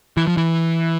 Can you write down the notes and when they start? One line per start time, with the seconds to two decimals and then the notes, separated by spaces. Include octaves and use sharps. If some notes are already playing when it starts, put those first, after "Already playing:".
0.17 E3
0.27 F3
0.37 E3